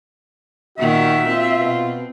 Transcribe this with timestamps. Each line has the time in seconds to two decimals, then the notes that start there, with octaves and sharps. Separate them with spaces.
0.78 A#2 D#3 F#4 E5
1.29 C4 F4
1.60 B2